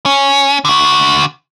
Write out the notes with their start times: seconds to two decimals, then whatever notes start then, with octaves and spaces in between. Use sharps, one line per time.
0.06 C#4
0.65 D3 F#4